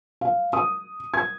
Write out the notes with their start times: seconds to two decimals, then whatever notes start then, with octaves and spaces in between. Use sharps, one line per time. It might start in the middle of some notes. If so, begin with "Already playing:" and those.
0.21 F5
0.53 D#6
1.14 G#6